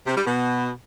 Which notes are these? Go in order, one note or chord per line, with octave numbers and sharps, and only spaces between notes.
C3
G3
B2